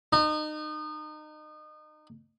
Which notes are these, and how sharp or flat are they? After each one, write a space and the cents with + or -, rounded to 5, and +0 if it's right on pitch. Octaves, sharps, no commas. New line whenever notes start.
D#4 -30